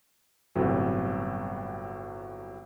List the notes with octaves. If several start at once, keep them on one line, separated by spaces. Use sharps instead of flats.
G1 A2 C3 F#3 G3